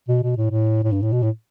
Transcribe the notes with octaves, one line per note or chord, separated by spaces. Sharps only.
B2
B2
A2
A2
A2
G2
A2
B2
A2